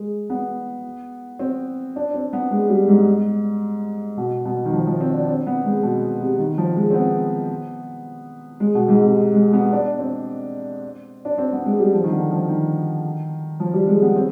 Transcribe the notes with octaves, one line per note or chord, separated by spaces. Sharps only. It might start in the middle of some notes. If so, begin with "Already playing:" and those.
Already playing: G#3
B3
C4
D4
C4
B3
G#3
G3
G#2
B2
B2
D#3
F3
F3
C4
D4
C4
B3
G#3
B2
C3
D#3
F3
G#3
C4
B3
G#3
B2
G#2
C3
G#3
B3
D4
C4
D4
C4
B3
G#3
G3
F3
D#3
D3
F3
D#3
F3
G3
G#3
B3
C4